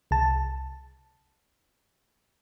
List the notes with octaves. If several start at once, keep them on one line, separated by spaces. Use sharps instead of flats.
C2 A5